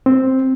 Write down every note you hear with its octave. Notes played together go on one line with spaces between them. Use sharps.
C4